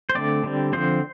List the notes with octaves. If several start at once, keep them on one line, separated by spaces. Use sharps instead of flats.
C5
D3 A3 C4 D5
D3 G3 C4
D3 F3 C4 C5